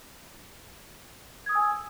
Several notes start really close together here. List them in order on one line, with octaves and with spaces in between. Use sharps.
G#6 D#6 E6 G#5